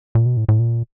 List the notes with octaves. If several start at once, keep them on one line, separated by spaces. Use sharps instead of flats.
A#2
B2
A2
A2
A#2